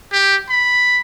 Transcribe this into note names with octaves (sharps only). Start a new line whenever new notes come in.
G4
B5